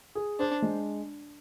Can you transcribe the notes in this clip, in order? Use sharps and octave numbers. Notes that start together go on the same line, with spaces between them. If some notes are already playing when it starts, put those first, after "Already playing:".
G#4
D4 C5
G#3